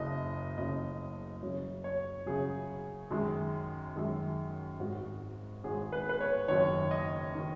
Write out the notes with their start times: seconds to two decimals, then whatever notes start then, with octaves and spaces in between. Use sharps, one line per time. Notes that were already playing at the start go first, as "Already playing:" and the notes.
Already playing: F#1 F#2 C#3 D#5
0.58 F#1 F#2 C#3 D#5
1.43 F#2 C#3 F#3 C#5
1.84 C#5
2.26 F#2 C#3 F#3 G#4
3.11 F#2 D#3 G#3
3.96 F#2 D#3 G#3
4.80 G#1 G#2 G#3 F#4
5.64 G#1 G#2 G#3 G#4
5.92 B4
6.09 B4
6.21 C#5
6.48 F#1 F#2 D#3 C#5
6.91 D#5
7.35 D#3